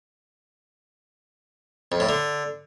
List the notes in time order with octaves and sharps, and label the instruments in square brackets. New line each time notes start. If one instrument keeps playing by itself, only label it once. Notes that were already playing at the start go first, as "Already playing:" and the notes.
[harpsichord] F2
A2
D3